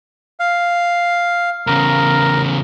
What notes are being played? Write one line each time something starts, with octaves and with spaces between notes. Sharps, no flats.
F5
E2 C#3 A#4